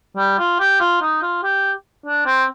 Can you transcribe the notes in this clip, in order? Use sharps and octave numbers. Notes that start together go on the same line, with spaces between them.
G3
F4
G4
F4
D#4
F4
G4
D4
C4